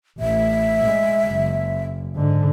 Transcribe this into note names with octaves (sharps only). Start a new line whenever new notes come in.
A1 E5
G#3
F#1
G#2 D3